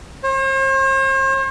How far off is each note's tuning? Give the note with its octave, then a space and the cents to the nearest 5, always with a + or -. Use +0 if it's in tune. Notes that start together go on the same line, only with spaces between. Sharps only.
C5 +45